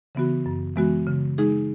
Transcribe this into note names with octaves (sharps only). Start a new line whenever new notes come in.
C#3 E3 B3 F#4
F#2
E3 G#3 B3 F#4
C#3
G#3 D#4 G#4